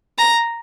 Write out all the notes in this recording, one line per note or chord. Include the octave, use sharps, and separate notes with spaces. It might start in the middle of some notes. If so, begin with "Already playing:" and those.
A#5